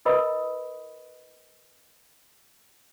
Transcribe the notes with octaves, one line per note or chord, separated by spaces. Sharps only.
E4 A#4 B4 D#5 B5 D#6